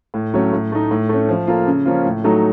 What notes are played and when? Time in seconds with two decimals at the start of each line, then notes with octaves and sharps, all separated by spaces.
0.14 A2
0.34 F#3 A3 C#4
0.53 A2
0.72 A3 D#4
0.91 A2
1.09 A3 C#4
1.29 F3
1.47 A#3 F4 A4
1.67 C#3
1.86 F3 A#3 C#4 F4
2.05 A2
2.24 F#3 A3 D#4 A4